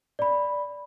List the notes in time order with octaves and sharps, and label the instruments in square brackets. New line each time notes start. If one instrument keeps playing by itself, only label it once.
[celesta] D5 B5